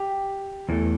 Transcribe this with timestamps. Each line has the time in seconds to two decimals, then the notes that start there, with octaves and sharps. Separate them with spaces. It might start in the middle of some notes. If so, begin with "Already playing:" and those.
Already playing: G4
0.69 E2 E3 A3